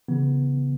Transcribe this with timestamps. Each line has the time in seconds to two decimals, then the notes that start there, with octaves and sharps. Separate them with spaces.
0.08 C#3 E3 B3